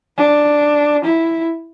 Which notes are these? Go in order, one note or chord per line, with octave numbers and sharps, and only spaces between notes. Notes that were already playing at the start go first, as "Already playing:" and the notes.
D4
E4